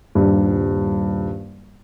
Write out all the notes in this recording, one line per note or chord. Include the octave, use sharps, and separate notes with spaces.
D#1 G2